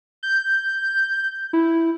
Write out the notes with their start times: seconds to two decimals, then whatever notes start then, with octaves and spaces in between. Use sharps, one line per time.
0.23 G6
1.53 E4